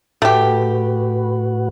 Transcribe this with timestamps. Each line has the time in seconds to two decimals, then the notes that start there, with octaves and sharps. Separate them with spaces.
0.22 A2 A3 F#4 G4 B4